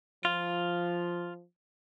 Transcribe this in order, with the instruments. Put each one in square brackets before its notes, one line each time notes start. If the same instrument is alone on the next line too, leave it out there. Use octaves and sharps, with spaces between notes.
[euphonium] F3 [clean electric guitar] F4